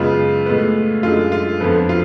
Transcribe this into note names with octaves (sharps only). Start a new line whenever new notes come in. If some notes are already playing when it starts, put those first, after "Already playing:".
Already playing: F#2 C#3 G#3 B3 F4
A2 G#3 B3
F#2 D3 G#3 F4
F4
F2 D3 F3 B3
F4